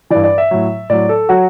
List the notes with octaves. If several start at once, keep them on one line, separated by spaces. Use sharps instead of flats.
G2 E3 D5
D5
E5
A2 F#3
A2 F#3 D5
A4
F#3 F#4